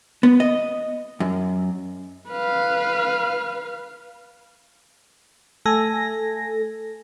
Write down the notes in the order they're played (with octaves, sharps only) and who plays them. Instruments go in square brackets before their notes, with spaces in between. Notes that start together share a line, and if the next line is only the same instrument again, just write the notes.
[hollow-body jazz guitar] B3
D#5
F#2
[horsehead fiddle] B4 F5
[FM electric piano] A3 A4 G#5 A#6